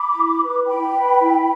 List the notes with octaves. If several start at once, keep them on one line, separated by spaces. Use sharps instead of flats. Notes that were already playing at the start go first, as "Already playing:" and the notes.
Already playing: B5 D6
E4
B4
E4 G5 B5
B4
E4